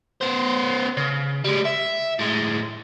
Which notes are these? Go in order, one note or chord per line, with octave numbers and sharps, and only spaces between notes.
B3 C5
C#3
G3 G#3
E5
A2 G#3